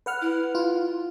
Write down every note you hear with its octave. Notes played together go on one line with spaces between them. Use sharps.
B4 F#5 F6
E4
F4